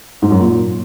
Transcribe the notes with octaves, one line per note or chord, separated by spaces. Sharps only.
G#2
F#2
A#2